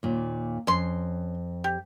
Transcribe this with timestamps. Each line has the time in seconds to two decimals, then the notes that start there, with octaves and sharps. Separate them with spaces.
0.03 D#2 A#2
0.67 F2 C#4 C6
1.64 G4